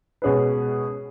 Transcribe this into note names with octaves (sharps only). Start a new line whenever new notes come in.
B2 G#3 C#4 G#4 B4